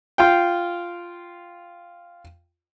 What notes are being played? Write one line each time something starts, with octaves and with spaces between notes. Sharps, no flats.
F4 F5 G5